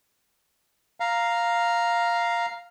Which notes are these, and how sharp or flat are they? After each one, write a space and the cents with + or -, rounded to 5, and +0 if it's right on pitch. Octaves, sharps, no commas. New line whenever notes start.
F5 +0 A#5 +0